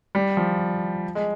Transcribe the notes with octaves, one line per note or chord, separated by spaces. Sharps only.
G3
F3
G#3